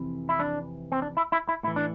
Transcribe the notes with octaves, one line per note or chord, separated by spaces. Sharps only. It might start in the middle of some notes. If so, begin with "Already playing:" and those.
Already playing: F2 C3 E3
E4
D4
C4
D4
E4
E4
E4
A2 E3 E4
D4